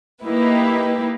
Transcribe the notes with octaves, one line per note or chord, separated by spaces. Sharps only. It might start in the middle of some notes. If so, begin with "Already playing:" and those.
A#3 D#4 E4 G4 B4